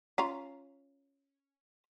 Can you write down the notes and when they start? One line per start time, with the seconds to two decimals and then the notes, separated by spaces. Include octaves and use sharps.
0.18 C#4 F4 A#5